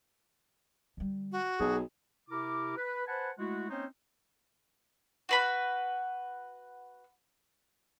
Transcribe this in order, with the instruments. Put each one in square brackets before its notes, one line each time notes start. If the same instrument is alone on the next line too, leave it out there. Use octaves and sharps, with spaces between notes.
[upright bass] D3 G3
[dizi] F#4
[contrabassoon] B1 [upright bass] C4 [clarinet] G#4
[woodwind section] C3 E4 G4 A#4 D6
B4
B4 C5 F#5 G#5 A5 B5
G#3 A3 E4 F#4
A#3 C4 C#4 D#4 C5 C#5
[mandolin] F#4 B4 B5